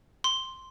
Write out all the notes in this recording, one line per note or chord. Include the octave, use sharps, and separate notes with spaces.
C6